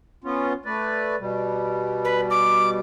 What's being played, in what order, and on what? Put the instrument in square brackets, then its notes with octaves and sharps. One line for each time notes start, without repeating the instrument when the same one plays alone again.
[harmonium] B3 C#4 F4
A3 B4 D5
B2 G3
[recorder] B4
D6